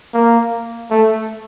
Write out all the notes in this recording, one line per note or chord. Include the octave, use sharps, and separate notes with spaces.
A#3
A3